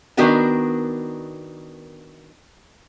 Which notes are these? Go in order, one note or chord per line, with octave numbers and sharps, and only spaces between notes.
D#3 B3 D4 F#4 A#4